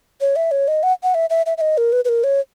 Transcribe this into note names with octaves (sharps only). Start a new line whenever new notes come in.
C#5
E5
C#5
D#5
F#5
F#5
E5
E5
E5
E5
D#5
A#4
B4
B4
A#4
C#5